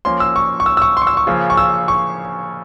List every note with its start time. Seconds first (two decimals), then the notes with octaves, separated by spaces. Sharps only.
0.05 F3 A#3 C#4 C6
0.20 E6
0.36 C#6
0.60 C#6
0.66 E6
0.77 E6
0.82 C#6
0.97 C6 C#6
1.07 E6
1.17 C#6
1.27 C#3 F3 A#3 C#4
1.50 C#6
1.57 E6
1.88 C#6